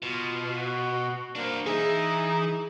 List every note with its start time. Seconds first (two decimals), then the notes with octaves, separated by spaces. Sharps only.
0.03 B2 F4
0.56 F#4
1.36 A#3 D4 C5
1.66 E3 D#4 G#4 E5